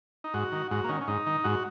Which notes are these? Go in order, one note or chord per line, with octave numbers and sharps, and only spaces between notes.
D#4
G#2 F#4
D#3
G#2 F#4
A#3
D#3 C#4
C#4
G#2 D#4
D#3
G#2 F#4